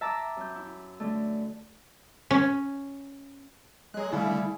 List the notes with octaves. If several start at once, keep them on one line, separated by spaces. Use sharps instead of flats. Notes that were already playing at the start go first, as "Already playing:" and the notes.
E5 A5 A#5 D6 E6
F#2 G6
E4
D3 A3
C#4
F#3 G#3 G#4 F#6
D3 G3 A3 E4 G#4 F5